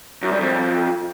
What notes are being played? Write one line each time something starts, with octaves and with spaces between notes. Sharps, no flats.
F#2
G2
F2